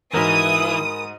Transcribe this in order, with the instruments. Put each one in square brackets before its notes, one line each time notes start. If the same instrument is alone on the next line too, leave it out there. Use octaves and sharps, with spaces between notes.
[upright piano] G#2 F#4 A#6 [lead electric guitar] E3 [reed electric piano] A#4 G#5 B5 [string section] D#6